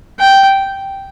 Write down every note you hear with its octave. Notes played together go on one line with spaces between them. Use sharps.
G5